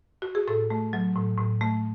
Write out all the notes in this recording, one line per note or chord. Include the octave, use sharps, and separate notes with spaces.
F#4
G#4
A2 A4
A3
F#3
A2
A2
A3